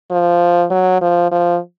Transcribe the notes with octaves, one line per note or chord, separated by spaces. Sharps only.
F3
F#3
F3
F3